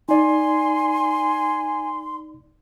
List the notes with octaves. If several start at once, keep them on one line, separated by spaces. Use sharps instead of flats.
D#4 D5 G#5 C6